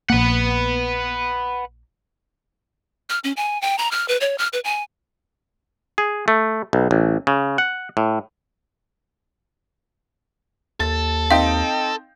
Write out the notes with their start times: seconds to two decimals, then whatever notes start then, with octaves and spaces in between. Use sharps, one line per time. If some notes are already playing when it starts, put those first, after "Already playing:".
0.10 A#1 A#3 B4 F#5
3.10 F6
3.24 C#4
3.37 G#5
3.62 G5
3.78 A#5
3.91 F6
4.08 B4
4.21 C#5
4.38 F6
4.53 B4
4.64 G#5
5.98 G#4
6.28 A3
6.73 B1
6.91 A1
7.27 C#3
7.58 F#5
7.97 A2
10.80 D#2 A4 A6
11.31 C4 D#4 F5 G5